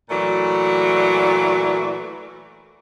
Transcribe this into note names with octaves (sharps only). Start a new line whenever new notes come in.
A#2 E3 F#3 A3 D5